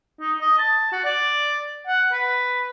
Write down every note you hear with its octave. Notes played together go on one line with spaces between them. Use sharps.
D#4
D#5
A5
F#4
D5
F#5
B4